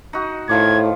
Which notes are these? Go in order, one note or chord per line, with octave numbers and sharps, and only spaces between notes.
D#4 F#4
A2 D#3 F3 D6 G#6